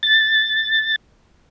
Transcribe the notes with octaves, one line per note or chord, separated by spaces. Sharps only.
A6